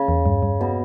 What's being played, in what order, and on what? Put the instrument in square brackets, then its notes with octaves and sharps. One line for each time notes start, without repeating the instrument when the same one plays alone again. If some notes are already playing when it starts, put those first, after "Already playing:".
Already playing: [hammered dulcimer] C#3
[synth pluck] E2
G2
G2
[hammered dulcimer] B2